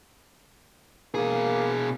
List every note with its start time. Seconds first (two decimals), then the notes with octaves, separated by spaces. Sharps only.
1.14 B2 A#3 G#4